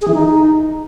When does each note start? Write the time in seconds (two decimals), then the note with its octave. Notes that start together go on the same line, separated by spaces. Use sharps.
0.01 G#4
0.08 E3
0.14 D#4